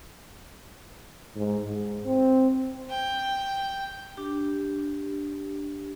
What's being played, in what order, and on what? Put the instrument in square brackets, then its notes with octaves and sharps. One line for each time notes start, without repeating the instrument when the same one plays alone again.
[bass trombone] G#2
G#2
C4
[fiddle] G5
[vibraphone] D4 G4